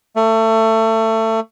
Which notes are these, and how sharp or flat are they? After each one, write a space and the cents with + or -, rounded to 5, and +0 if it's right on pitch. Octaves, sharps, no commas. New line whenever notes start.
A3 +25